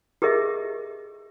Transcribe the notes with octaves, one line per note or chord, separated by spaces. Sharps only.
G4 G#4 A#4 D#5 E5